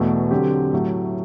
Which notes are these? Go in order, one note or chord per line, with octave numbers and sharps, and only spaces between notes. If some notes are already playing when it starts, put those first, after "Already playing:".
Already playing: E2 B2 A3
D3 F#3 C4 G4
A2 F#3 A3